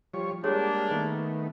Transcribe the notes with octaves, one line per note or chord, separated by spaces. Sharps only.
F3 G3 C#5
G3 G#3 A#3 D4 G4 G#4 C#5
D#3 A3 B3